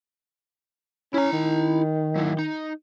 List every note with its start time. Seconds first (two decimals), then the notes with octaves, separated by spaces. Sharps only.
1.14 C#4 E4 A#5
1.33 D#3
2.16 F#3 E4
2.39 D#4